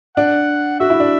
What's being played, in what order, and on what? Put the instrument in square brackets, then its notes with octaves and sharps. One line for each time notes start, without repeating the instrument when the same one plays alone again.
[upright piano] D4 [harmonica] F#5
[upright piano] F#4 [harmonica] E5
[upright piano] E4
D4